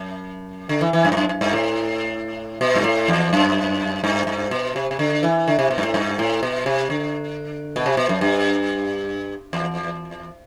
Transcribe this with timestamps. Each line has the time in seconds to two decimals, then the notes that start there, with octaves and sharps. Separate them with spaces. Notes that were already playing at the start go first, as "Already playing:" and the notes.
Already playing: F#2
0.69 D3
0.81 E3
0.93 E3
1.05 F#2
1.12 G2
1.17 F#2
1.29 F#2
1.41 G2
1.53 A2
2.61 B2
2.76 G2
2.84 A2
3.08 E2
3.33 F#2
4.04 G2
4.27 G2
4.51 B2
4.76 C3
4.91 C3
4.99 D3
5.23 E3
5.48 D3
5.59 C3
5.71 B2
5.78 G2
5.83 A2
5.94 G2
6.19 A2
6.43 B2
6.66 C3
6.90 D3
7.76 B2
7.86 C3
7.97 B2
8.09 F#2
8.21 G2
9.53 E2